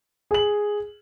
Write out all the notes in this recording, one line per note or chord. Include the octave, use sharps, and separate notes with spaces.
G#4 F#7